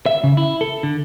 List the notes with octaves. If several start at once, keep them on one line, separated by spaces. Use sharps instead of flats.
E5
C#3
E4
A4
D3